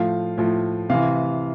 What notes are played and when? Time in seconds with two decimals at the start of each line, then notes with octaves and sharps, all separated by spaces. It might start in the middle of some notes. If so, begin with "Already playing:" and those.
Already playing: A2 F3 F5
0.38 A2 F3
0.90 C3 E3 F5